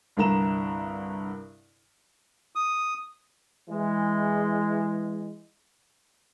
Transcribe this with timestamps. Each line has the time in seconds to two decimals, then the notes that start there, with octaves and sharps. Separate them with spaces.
0.17 C2 G2 D3 A#4 A#5 E7
2.56 D#6
3.69 E3 G#3